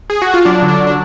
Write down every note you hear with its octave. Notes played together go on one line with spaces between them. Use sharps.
G#4
F#4
F4
F#3 D4
D3
D4
F#3
D4